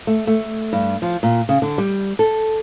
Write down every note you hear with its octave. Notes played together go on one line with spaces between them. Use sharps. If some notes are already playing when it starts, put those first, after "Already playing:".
A3
A3
G2
F3
A#2
C#3
D3
G3
A4